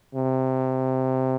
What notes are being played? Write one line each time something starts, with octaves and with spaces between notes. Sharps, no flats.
C3